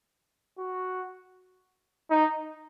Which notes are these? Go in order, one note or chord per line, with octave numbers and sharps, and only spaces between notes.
F#4
D#4